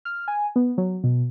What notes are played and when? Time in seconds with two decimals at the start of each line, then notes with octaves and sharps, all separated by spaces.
0.05 F6
0.28 G#5
0.56 B3
0.78 F#3
1.04 B2